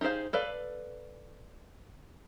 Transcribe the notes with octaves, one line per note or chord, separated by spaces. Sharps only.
D#4 G4 G#4 C5 F5
A4 B4 D5 F5